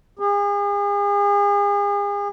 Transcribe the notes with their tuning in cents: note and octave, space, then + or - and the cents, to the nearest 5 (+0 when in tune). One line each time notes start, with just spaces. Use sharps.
G#4 -40